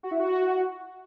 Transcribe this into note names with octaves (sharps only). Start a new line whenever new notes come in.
F#4
E4
F#4